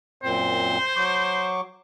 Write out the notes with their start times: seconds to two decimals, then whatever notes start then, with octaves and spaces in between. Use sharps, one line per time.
0.23 F#2 A#2 C4 C5
0.96 F#3 C#6 D6